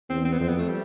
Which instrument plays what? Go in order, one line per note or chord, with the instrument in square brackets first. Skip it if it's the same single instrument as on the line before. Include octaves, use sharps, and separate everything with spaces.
[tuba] E2 [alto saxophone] C4
[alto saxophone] C4
B3
[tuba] F2 [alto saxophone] C4
[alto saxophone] B3
A3
G3